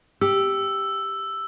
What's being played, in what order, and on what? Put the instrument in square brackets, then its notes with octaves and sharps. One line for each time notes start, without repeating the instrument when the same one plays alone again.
[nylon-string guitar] G4 [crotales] E6